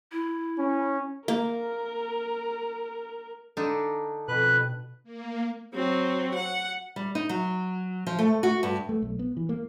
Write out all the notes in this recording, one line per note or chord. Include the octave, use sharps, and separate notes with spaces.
E4
C#4
A#3 A#4
D3 D4 D#4
F2 B2 B4 F#6
A#3
F#3 C4
F#5
G3
D#4
F#3
F3
A3
F#4
G2
A3
B1
B3
E3
A#3